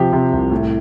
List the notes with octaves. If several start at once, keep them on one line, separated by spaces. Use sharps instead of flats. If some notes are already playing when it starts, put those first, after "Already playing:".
Already playing: C3 F3 G4
C3
C2
A2